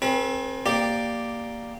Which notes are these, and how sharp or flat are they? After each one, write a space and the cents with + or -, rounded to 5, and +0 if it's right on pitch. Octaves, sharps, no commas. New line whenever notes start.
C4 +25 G#4 +45 B4 -35
A#3 +0 G4 +0 D5 +0